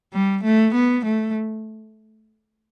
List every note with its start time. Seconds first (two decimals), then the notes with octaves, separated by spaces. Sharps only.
0.13 G3
0.43 A3
0.74 B3
1.05 A3